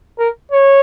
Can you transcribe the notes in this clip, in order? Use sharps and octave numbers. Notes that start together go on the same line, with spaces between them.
A#4
C#5